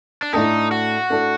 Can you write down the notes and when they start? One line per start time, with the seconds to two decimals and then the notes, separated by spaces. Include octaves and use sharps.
0.22 D4
0.33 A2 A3 D4 D#4 A4
0.71 F#4
1.10 A2 A3 D4 A4